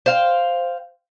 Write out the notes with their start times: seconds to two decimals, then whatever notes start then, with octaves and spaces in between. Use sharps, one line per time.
0.06 C5 F5 G5